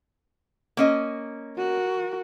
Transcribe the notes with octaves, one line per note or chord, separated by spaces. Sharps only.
A#3 C#4 D#5
F#4 A#4